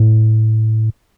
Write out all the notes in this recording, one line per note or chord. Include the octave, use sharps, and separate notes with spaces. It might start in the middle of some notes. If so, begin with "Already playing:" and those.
Already playing: A2